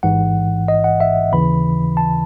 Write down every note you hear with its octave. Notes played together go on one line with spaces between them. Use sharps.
A1 G#2 E3 F#5
D#5
F#5
E5
D#2 C#3 E3 B5
A5